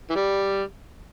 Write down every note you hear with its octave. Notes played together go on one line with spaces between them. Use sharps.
E3
G3